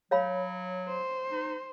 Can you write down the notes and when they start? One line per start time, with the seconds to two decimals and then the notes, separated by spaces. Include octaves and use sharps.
0.11 F#3 C#5 F5 B5
0.88 C5
1.31 D#4